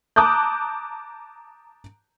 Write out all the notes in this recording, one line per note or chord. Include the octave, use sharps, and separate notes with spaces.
A5 A#5 D6 D#6 F#6 G6